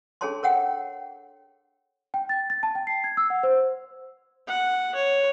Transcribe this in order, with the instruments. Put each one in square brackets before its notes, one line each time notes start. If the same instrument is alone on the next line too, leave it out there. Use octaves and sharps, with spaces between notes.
[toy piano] D4 G#4 A4 C#5 A5 C6
A#4 C#5 F#5 G5
[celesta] G5
A6
A6
A5
G5
C7
G#6
E6
F#5
C5
[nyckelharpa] F#5
C#5